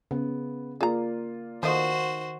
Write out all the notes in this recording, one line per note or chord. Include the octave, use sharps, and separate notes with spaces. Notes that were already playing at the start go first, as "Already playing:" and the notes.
C#3 B3
A#3 F4 G#4 D5 A#5
D#3 F3 A3 F#4 C5 D#5